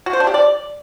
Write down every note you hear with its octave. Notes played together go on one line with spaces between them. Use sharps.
F#4
C5
D4
G4
D5